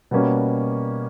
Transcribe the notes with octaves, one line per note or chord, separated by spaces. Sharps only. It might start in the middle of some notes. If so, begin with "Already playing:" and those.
B2 G3 A#3 C#4